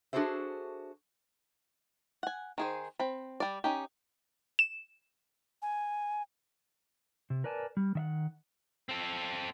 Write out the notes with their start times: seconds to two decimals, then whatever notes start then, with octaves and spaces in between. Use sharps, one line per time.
0.13 D4 F#4 G#4 A4 C5 E5
2.23 F#5 G#5
2.58 D#3 G#4 C5
2.99 C4 B5
3.40 G3 D5
3.64 C#4 D#4 G4
4.59 E7
5.62 G#5
7.30 C3
7.44 A#4 B4 D5 G#5 A5
7.77 G3
7.95 D#3 E5 F#5
8.89 C4 A4